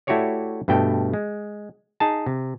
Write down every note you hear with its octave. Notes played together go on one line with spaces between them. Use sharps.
A3 E4 F#4 G4 C#5 D5
G2 B2 A3 G5
G#3
D#4 G#4 A5
C3